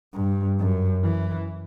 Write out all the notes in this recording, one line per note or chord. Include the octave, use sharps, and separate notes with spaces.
G2
F#2
E3